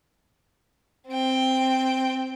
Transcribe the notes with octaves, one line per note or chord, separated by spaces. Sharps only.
C4 G5